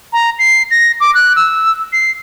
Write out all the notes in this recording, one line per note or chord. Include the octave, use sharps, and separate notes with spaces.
A#5
C7
A#6
D6
F#6
E6
C7